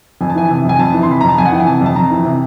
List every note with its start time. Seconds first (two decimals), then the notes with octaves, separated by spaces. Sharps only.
0.21 F2 G#5
0.29 A5
0.35 E3 G#5
0.50 C3
0.65 F2 G#5
0.79 F2 A5
0.94 E3
1.03 C6
1.09 C3 B5
1.21 F2 A#5
1.29 A5
1.38 F2 G#5
1.45 F#5
1.52 E3 G5
1.60 G#5
1.67 C3 A5
1.81 F2 A5
1.96 F2 A#5
2.11 E3
2.25 C3